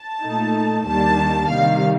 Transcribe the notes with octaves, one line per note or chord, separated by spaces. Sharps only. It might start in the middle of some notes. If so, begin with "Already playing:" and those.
Already playing: A5
A#2 A3 D#4
D#2 D#3 G3 A#3 D4 A5
C3 D#3 G3 F5